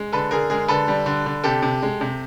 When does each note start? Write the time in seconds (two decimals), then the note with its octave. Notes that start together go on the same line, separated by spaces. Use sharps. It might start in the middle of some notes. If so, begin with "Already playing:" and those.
Already playing: G#3
0.13 D3 A4 B4
0.31 D3 G#4 A#4
0.50 G#3 G#4 A#4
0.68 D3 A4 B4
0.88 G3
1.06 D3
1.26 D3
1.44 C3 G4 A4
1.62 C3
1.82 G#3
2.01 C3